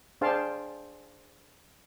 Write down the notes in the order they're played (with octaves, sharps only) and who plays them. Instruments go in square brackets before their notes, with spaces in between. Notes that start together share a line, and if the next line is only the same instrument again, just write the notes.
[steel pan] D4 G#4 C5 F5 G5 A5